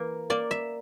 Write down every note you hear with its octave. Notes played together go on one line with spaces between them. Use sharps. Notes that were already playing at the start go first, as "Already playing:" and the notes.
Already playing: E3 A#3
A#3 D5
E5